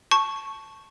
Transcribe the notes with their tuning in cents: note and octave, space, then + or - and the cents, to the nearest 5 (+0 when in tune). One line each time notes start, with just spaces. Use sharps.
A5 +0 C#6 +0